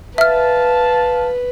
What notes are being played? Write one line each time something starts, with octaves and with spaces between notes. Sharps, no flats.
B4 E5 F5 A5 F6